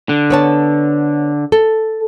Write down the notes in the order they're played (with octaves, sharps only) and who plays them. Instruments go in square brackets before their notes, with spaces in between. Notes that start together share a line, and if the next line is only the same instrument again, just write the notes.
[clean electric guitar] D3
[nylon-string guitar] B3 C#5 A5
A4